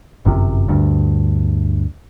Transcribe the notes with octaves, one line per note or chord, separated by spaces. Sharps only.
G1 F#2 C3
D2 G2